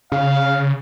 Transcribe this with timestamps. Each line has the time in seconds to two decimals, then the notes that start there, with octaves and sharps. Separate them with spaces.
0.12 C#3 F5